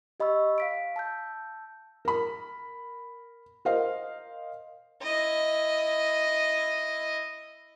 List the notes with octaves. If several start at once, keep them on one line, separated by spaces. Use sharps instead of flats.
G4 D#5 B5 C#6 E6
F5 B6 D7
A5 E6 G6
A#4 B5
A#4 C5 D#5 F5
E4 D#5